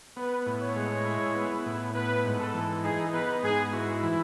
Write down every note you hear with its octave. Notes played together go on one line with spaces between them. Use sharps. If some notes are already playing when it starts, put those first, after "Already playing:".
B3 B4
A2
C#5
G#3
E4
B3
A2
B3 B4
G#2
A4
E3
D#4 G#4
B3 B4
G#2 G#4
E4 F#4
E3